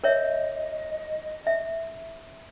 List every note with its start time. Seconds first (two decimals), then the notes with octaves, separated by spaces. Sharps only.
0.04 A#4 C#5 D#5 E5
1.47 E5